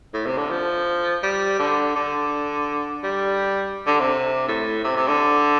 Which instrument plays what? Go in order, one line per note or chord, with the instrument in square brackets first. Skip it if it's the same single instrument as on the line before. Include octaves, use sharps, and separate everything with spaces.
[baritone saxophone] A2
C3
D3
F3
G3
D3
D3
G3
D3
C3
A2
C3
C3
D3